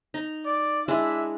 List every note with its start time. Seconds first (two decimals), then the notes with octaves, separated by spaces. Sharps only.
0.14 D#4
0.46 D5
0.88 G#3 D4 E4 E5